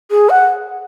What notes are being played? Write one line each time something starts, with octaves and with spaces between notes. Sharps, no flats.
G#4
F#5